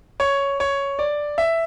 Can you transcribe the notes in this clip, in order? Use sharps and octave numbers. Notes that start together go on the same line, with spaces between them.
C#5
C#5
D5
E5